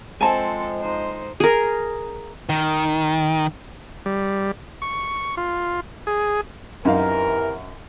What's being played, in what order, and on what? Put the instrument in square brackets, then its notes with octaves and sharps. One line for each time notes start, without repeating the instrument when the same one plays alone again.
[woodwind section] F3 G#3 [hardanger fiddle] C4 A4 [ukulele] G#5 A5
[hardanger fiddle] D#4 C5
[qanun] G#4 A#4
[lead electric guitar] D#3
[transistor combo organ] G3
C#6
F4
G#4
[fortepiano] F#2 D#4 F5 [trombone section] C3 E3 A#4